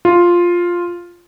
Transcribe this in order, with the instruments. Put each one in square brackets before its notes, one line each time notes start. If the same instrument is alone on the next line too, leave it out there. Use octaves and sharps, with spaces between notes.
[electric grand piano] F4